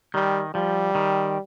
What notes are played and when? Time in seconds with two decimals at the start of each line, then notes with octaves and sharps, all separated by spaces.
0.14 D#3 G3
0.55 F3 G3
0.95 D#3